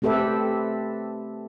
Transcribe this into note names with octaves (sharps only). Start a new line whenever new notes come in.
A3 C4 G4 A4 B4 E5